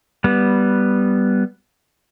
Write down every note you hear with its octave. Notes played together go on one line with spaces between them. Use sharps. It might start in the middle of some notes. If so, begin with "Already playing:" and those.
G3 B3